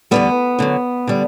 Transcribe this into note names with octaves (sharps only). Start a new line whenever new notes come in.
E2 D3 G3 B3
F#2 D3 F#3
D3 G3